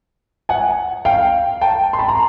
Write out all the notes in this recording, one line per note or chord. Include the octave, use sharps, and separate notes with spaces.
F#5 G#5
F5 G5
G5 A5
C6
A5 B5
A#5 C6